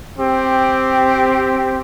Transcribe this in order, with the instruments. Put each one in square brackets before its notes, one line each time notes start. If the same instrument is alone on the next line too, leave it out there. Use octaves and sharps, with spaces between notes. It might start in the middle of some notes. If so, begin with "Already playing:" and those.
[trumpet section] C4 G4